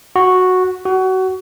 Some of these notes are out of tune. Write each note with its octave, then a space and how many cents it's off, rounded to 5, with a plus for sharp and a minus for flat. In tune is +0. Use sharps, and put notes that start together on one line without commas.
F#4 -5
F#4 +25